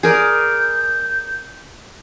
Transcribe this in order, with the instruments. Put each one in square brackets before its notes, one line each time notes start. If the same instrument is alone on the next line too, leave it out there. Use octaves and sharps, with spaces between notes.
[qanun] G#4 A#4 D5 [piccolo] G6